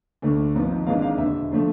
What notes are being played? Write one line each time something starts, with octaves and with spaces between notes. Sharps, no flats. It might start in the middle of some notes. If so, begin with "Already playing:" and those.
D2 D3 A3 D4
G#1 G#2 F3 B3
G#1 G#2 E3 G#3 D4 F5
F5
E1 E2 D3 E5
D3 F3 A3